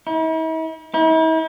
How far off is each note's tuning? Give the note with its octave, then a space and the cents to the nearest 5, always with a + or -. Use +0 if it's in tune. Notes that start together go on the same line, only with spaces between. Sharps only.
E4 -45
E4 -45